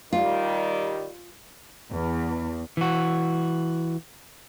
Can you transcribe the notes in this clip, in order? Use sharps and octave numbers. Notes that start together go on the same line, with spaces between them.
D#3 G3 F4
E2
E3 F#4